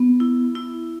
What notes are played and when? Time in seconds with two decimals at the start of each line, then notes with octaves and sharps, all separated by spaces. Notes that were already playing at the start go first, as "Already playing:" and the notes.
Already playing: B3
0.20 E4
0.55 E4